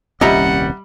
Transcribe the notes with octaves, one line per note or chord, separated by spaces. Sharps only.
D#1 C2 G3 C#4 D#5 E5 F#5 A#5